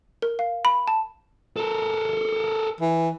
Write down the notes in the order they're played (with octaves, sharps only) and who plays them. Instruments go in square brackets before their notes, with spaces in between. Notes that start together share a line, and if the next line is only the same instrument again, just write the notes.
[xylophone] A#4
F5
B5
A5
[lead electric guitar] A4 A#4
[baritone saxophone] E3